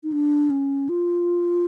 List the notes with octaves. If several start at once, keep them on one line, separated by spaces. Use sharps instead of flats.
D#4
D4
C#4
F4